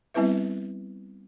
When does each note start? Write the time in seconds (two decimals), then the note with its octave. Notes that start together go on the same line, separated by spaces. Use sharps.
0.14 G3 B3 C4 E4 B4 E5